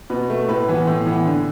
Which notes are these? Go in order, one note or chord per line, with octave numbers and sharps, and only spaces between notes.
B2 B4
A3
A2 B4
E3 B3
A2
E3 B3
D3